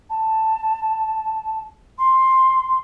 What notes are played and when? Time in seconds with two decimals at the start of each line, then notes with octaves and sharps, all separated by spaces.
0.10 A5
1.98 C6